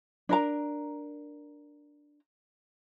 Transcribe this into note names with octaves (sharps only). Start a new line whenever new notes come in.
D4 A#4 A#5